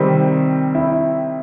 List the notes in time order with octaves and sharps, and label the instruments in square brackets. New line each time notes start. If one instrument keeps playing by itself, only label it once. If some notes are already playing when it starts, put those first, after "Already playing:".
Already playing: [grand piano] C3 D#3 G3 C4
E4